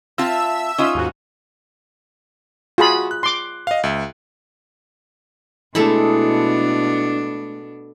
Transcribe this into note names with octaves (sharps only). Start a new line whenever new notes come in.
C4 F4 E5 A5 E6
C#4 D#4 F4
D#2 G#2 F#4
F4 F#4 G#4 B5
F#6
C6 D6
D#5 F5
C#2 E5
B2 G#3 A3 D4 E4 A4 B5